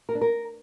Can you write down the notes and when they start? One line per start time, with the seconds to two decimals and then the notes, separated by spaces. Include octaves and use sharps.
0.09 A#4
0.15 D4
0.21 A#4